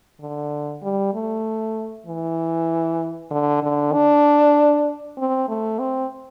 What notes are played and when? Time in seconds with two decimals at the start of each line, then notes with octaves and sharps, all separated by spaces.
0.20 D3
0.82 G3
1.14 A3
2.07 E3
3.31 D3
3.63 D3
3.93 D4
5.18 C4
5.48 A3
5.79 C4